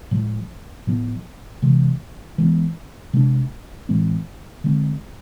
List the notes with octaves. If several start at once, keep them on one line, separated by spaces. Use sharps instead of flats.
A2 F3 G#3
A2 F3 B3
C3 E3 G#3
E3 G#3 B3
C3 G#3 B3 D4
A2 E3 G#3 C4
D3 G#3 C4